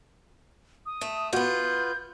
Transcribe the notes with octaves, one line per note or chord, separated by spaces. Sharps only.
D#6
A3
B3 F4 F#4 G5 B5 G6